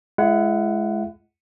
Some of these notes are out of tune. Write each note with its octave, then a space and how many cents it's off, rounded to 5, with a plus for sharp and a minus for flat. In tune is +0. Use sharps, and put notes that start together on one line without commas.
G#3 +20 E4 +40 F#5 +0